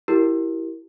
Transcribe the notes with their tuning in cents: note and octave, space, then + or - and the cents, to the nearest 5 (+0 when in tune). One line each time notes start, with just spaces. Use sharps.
E4 +0 G4 -20 A#4 +0